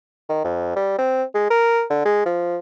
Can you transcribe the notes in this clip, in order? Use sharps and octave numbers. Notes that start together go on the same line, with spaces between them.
D#3
F2
G3
C4
G#3
A#4
D3
G#3
F3